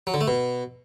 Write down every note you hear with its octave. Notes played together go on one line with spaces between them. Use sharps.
F#3
D3
A3
B2